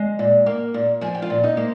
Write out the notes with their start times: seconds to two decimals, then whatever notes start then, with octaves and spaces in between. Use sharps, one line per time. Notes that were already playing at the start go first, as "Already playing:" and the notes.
Already playing: G#3
0.19 A#2
0.46 A#3
0.74 A#2
1.01 F3 G#4 G#5
1.15 G5
1.22 F4 F5
1.30 A#2
1.44 D#4 D#5
1.57 A#3 C5